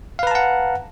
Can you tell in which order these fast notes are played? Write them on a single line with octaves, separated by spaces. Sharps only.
F5 B4 A#5 A5 F#5